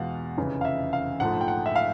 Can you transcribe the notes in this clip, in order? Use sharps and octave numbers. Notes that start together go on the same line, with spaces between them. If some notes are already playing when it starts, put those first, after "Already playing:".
Already playing: E2 B2 G#3 F5 F#5
F1 E2 C#3 E3
F5
E5
F5
A#1 G#2 F3 A3 F#5
G5
F#5
E5
F5